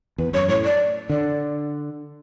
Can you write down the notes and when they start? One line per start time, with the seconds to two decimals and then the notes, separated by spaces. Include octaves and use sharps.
0.18 E2 B4
0.33 F#2 C#5
0.49 A2 C#5
0.64 D5
1.10 D3 D5